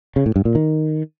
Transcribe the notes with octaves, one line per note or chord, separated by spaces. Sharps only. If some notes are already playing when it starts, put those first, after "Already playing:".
C#3
A2
G2
A#2
D#3